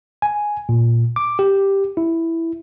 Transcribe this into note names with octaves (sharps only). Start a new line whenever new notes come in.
G#5
A#2
D6
G4
E4